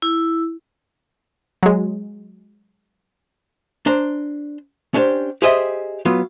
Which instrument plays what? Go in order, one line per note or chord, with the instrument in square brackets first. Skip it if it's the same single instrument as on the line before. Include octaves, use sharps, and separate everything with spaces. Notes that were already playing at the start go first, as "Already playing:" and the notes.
[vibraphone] E4
[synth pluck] F#3 G#3
[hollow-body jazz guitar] D4 C5 A#5
C#4 D4 G4 C5
G4 G#4 C5 D#5 E5 G5
F#3 B3 F4